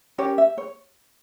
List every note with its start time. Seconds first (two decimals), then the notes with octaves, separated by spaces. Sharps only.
0.18 C#4 G4 A#4 C#5
0.38 E5
0.58 C#5